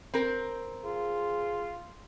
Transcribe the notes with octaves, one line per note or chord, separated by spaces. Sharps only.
C4 A#4
F4 G#4